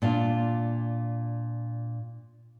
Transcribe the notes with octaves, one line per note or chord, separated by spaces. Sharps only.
A#2 D4 F4